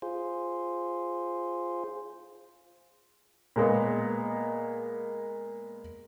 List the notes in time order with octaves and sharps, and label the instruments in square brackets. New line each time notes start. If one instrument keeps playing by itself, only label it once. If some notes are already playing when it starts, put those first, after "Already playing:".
[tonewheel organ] F4 G#4 C5
[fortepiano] A#2 G#3 A#3 B3